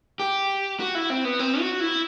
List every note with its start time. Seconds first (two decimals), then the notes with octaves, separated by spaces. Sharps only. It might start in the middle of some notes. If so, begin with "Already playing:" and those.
0.20 G4
0.80 F#4
0.95 E4
1.10 C4
1.25 B3
1.39 C4
1.60 F#4
1.80 E4